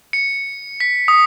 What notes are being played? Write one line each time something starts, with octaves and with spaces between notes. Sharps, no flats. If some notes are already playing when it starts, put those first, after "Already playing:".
C#7
B6
D#6